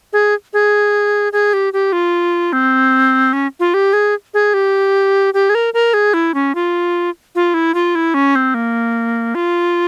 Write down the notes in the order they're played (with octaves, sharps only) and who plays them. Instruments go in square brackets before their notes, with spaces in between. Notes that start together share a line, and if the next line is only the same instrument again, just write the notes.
[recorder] G#4
G#4
G#4
G4
G4
F4
C4
C#4
F4
G4
G#4
G#4
G4
G4
G#4
A#4
A#4
G#4
E4
C#4
F4
F4
E4
F4
E4
C#4
C4
A#3
F4